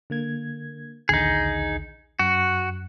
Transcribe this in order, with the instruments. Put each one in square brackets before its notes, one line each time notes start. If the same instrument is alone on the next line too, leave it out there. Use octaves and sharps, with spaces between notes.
[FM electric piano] D3 A#3 G#6
[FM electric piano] A#1 D#2 D3 [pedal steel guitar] D#4 G#4
[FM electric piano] F#2 [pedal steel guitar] F#4